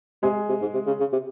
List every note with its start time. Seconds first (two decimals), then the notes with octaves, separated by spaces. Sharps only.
0.23 C3 G#3 G#4
0.49 C3
0.62 G#2
0.74 C3
0.87 C#3
1.00 C#3
1.12 C3